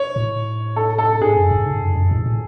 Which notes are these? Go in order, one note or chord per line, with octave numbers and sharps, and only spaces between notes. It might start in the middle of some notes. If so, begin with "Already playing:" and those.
Already playing: C#5
A2
A4
A4
G#2 G#4
F#2
G#2
C#3
G#2
F#2
F#2
A2
A2